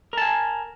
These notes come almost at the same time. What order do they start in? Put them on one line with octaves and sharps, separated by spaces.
A#4 A5 G#5